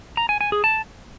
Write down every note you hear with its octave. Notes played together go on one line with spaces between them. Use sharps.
A#5
G#5
G#5
G#4
A5